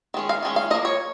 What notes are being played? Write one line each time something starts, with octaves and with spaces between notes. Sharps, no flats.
D#3 G#3 C#4
F5
D#3 G#3 C#4
F5
D#4 D#5
F3 A#3
C#5